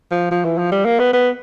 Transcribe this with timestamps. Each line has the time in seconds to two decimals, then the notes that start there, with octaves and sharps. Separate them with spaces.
0.11 F3
0.31 F3
0.45 E3
0.58 F3
0.72 G3
0.85 A#3
0.99 B3
1.13 B3